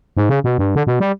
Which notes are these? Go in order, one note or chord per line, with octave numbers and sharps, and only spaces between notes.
G#2
C#3
B2
G2
D3
B2
G3